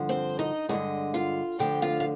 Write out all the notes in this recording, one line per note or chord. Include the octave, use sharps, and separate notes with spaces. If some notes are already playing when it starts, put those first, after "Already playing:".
Already playing: G2 D3 F3
C4 C5
D#4 D#5
G2 D3 F3 G#3 D#4 D#5
F4 F5
D2 D3 F3 G4 G5
F4 F5
F5